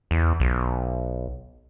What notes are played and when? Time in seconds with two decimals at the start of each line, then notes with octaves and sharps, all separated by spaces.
0.11 E2
0.40 B1